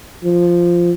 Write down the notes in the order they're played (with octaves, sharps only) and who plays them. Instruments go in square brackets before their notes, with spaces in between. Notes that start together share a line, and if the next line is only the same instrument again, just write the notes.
[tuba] F3